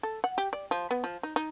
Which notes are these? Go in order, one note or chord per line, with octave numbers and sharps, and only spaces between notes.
A4
F#5
G4
D5
F3
B3
F3
D#4
D#4